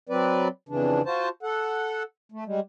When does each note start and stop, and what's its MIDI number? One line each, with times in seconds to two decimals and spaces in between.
0.09 0.48 54
0.09 0.48 60
0.09 0.48 71
0.09 0.48 74
0.69 1.01 41
0.69 1.01 49
0.69 1.01 52
0.69 1.01 62
1.06 1.29 65
1.06 1.29 66
1.06 1.29 72
1.06 1.29 81
1.43 2.03 69
1.43 2.03 78
2.32 2.44 57
2.46 2.60 55
2.46 2.60 56